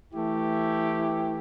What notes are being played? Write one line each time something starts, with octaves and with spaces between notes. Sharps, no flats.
E3 A3 E4 G4